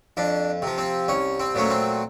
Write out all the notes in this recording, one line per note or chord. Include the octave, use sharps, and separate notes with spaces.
F2 D4
C3 F3
C4
C2 C#4
C4
A#2 F#3 A3 C#4
C4